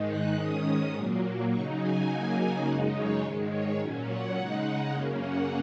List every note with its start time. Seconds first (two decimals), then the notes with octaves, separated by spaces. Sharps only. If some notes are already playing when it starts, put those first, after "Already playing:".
Already playing: G#2 D#3 G#3 D#4
0.08 F#6
0.37 G#2 D#3 G#3 C#4 D#6
0.94 A#2 F#3 A#3
1.50 C#3 F#3 D#4 C#6
1.79 G#5
2.07 C#3 F#3 A#3 D#4 G#5
2.64 F#2 C#3 G#3 D#4 F#5
2.93 C#5
3.22 G#2 D#3 G#3
3.50 C#5
3.79 A#2 F#3 C#4
4.07 F#5
4.36 C#3 G#3 D#4 F#5
4.92 F#2 C#3 A#3 C#4
5.21 F#5